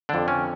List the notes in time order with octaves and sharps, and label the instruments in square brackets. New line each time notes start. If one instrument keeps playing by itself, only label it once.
[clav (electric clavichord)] F2 D3 D4
C#4